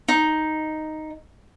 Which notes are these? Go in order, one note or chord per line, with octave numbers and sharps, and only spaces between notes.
D#4